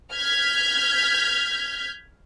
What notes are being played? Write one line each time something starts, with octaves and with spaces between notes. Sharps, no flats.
F6 G6 G#6 B6